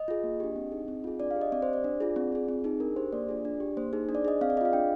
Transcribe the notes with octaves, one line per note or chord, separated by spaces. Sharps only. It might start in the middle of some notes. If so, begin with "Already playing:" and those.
Already playing: D#5
F4 G#4
A#3
D4 G4
C4
D#4 G#4
C4
F4 G#4
D4 D5
F5
G4
D#5
C4 D5
C5
G4 D5
D4
F4 G#4
C4
F4 G#4
C4
D#4 G#4
D4 A#4
G4 C5
A#3 D5
D4 F4 G#4
D4
G4
A#3 C5
D#4 G#4
D4
D5
G#4 D#5
C4 F5
D5
F4 G#4 D#5 F5
D4 G5